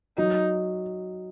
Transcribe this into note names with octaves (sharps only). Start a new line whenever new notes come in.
F#3 D#4